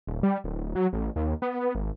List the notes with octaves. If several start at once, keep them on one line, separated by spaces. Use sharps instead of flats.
D#1
G3
D1
F#3
A1
D#2
B3
G#1